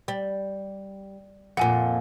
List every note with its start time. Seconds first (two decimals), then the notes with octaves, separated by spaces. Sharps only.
0.08 G3
1.57 F2 A#2 F#5 G#5